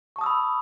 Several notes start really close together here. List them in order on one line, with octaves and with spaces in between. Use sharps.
C#6 A5 D#6 E6 B5